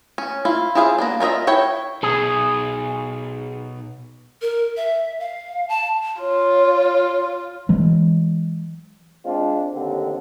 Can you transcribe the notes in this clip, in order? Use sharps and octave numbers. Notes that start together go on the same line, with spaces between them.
C#4
E4 F4
E4 F4 G#4 C5 F5
A#3 B3 D4
F4 A#4 C#5 D#5 E5
E4 C#5 G5
B2 D#4 G#4
A#4
E5
F5
A5
F4 C#5
E3 F#3 G#3
G#3 C4 D4 F4
A1 D#2 D3 C4